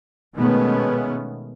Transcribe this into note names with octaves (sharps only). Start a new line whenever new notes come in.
B2 D#3 G#3 A3 B3 C#4